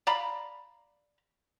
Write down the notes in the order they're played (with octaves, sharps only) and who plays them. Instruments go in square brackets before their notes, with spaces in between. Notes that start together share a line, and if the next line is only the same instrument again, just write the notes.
[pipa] D5 F5 A#5 B5